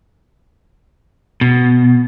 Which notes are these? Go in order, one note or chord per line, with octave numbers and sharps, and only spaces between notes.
B2